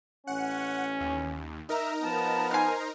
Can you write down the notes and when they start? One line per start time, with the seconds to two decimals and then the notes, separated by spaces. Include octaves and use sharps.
0.27 A1 C#4 F#5
1.00 D#2
1.69 D#4 A#4 E5 A#5
2.02 F3 B3 A5
2.51 C5 G#5 F6